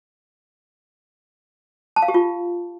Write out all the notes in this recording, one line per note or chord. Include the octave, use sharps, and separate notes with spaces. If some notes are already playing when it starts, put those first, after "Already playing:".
A5
F5
G4
F4